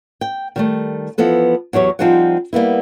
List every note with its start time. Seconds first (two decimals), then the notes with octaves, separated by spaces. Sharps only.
0.21 G5
0.56 D#3 G3 A3
1.18 E3 F3 B3 A4 B4
1.73 E2 F#3 G4 C#5
1.99 F3 G3 C4 D#4 G#4 F#5
2.53 G3 A#3 B3 E4